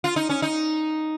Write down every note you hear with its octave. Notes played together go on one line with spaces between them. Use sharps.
F4
D#4
C#4
D#4